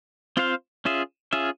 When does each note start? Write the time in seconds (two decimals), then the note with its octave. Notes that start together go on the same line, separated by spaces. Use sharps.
0.37 C4 F4 C5 F5
0.85 C#4 F4 G#4 E5
1.33 C#4 F4 G#4 E5